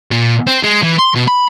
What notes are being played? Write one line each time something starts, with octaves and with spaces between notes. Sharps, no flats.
A#2
C4
G#3
E3
C6
B2
B5